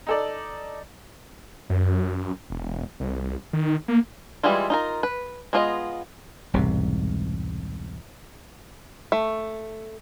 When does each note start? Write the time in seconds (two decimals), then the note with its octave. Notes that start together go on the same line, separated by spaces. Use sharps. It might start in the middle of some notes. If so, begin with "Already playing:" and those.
0.07 D#4 A4 D5
1.70 F#2
2.50 E1
3.00 C2
3.53 D#3
3.88 A#3
4.43 E3 G3 G#3 E4 F4
4.70 D#4 F4 A#4
5.03 B4
5.53 G#3 B3 F4 C5 D#5
6.53 E1 C2 G#2 C3
9.12 A3